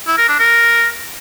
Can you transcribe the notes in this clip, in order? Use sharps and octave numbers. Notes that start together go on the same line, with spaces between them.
E4
A#4
D4
A#4